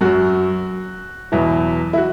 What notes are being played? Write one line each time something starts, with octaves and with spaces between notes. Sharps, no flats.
F#2 F#3 F#4
E2 B2 F#3 E4
E4
F#4